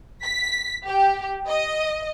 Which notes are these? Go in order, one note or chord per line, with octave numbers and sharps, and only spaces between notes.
B6
G4
D#5